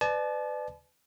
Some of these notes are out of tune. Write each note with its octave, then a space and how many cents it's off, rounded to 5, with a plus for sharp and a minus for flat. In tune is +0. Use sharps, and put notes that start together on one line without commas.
B4 +30 D5 +25 A5 -35